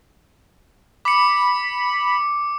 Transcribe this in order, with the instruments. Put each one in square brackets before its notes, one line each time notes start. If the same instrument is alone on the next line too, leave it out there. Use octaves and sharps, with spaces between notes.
[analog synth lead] B5 [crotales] D6 C#7